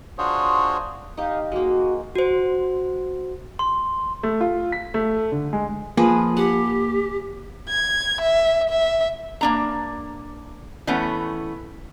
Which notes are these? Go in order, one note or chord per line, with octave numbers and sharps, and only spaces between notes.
D4 F4 F#4 G#4 C5 C#5
D#4 G4 F5
G#3 A#3 F#4
F#4 C5
C6
A3
F4
B6
A3
D3
G#3
F3 A#3 G#4 B4
G4 F#5
G#6
E5
E5
A#3 D4 A#5
E3 A3 B3 C#4